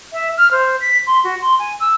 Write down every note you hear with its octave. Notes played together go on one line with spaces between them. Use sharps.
E5
F6
C5
B6
C6
F#4
C6
G#5
E6